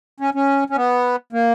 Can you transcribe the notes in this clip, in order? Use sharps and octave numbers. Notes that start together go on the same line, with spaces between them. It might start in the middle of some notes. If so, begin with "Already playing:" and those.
C#4
C#4
C#4
B3
A#3